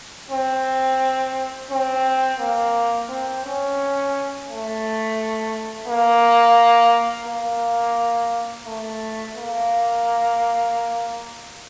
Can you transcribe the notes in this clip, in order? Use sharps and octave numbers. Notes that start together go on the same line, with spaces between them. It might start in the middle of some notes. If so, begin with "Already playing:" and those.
C4
C4
A#3
C4
C#4
A3
A#3
A#3
A3
A#3